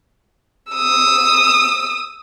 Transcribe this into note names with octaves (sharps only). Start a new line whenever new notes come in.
D#6 E6